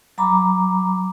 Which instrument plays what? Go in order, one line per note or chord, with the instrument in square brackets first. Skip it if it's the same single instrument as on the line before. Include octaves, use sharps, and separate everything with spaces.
[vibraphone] F#3 A#5 B5 D6